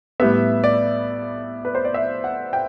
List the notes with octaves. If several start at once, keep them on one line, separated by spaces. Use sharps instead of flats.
A2 G3 B3 E5
D5
B4
C5
D5
E5
F#5
G5